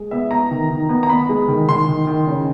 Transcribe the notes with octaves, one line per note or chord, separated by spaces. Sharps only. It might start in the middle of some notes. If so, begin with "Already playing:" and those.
Already playing: G#3
B3 E5
B3 A#5
D#3
D#3
B3
A#5
B3 B5
G#3
D#3
D#3 C6
D#3
D#3
C#3